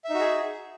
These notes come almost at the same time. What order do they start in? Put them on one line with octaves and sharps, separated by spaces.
E5 D#4 F#4 G#4